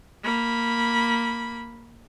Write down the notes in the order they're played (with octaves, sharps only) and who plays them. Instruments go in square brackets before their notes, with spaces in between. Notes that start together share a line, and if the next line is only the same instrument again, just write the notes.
[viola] A#3 B5